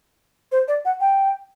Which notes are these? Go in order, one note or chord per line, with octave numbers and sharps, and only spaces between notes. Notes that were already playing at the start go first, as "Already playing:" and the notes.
C5
D5
F#5
G5